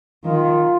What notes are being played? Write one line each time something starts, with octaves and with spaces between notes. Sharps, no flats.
D#3 F4